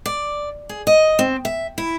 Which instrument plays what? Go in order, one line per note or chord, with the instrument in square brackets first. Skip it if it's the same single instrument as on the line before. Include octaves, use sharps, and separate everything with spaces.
[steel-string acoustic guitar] D5
G#4
D#5
C4
E5
E4